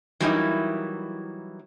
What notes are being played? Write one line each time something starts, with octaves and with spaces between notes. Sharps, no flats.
E3 F#3 G3 A#3 D#4 E4